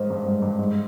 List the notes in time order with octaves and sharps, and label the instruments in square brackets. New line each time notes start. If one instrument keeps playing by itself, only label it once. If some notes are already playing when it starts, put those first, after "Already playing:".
Already playing: [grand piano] G#2 [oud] D#3 F3
[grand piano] G2
G#2
G2
G#2